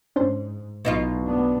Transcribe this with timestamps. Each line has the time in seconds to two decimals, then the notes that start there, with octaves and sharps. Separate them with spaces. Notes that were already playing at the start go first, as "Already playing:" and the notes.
0.16 G#2 C#4 D4 C5
0.85 B1 B2 D#4 F4
1.26 B3 D4